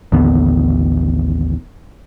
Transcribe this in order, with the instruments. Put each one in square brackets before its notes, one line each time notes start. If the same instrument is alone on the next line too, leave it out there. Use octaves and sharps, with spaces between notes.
[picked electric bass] A1 D#2 D3 B3